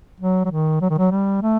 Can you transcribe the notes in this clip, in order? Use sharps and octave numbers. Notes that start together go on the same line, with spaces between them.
F#3
F#3
D#3
F#3
D#3
F#3
G3
A3